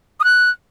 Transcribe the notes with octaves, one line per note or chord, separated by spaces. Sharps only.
D#6
F#6